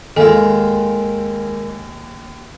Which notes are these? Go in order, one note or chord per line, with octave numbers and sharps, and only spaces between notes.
D#2 D#3 G#3 F4 A4 D#5 G#5